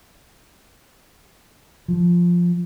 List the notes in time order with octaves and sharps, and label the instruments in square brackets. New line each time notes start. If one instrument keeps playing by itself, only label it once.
[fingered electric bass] F3